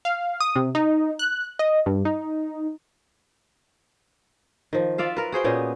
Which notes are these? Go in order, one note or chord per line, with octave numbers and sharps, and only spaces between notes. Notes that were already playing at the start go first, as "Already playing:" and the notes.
F5
D#6
C3
D#4
F#6
D#5
G2
D#4
D#3 F3
F4 D5 E5 F5
A#4 B4
F#4 G#4 C5 G5
A#2 B3 C#4 D#5